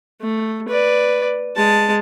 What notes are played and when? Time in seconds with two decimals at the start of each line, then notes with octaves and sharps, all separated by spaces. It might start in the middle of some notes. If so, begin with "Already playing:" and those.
0.22 A3
0.68 B4 D5
1.56 G#3 A5